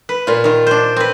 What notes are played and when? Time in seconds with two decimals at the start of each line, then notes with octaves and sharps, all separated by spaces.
0.09 B4
0.27 A#2 F4
0.44 D#3 F4
0.67 D4 C5
0.97 C4 B4